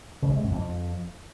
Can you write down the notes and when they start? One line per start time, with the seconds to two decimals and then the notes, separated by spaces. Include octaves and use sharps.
0.22 C#3
0.30 G3
0.37 G#3
0.44 F#2
0.51 F2